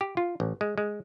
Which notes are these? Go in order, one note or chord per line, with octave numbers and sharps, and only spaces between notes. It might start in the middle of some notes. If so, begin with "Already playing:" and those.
G4
F4
A1
G#3
G#3